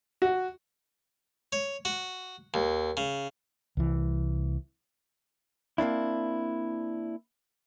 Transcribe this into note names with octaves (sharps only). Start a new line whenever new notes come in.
F#4
C#5
F#4
D#2
C#3
C2 E3
A#3 C4 D4 E4